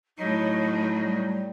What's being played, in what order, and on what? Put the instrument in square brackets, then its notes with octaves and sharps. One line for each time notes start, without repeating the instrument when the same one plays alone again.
[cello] A2 F#3 [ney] D#4
[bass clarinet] G3